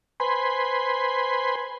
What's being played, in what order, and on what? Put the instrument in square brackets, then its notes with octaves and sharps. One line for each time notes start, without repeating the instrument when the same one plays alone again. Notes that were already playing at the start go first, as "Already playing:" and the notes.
[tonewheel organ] B4 C5 G#5 B5 C6